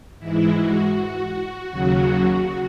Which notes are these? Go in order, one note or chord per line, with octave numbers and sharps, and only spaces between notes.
G#2 E3 G#3 E4
F#4
D#2 C#3 F#3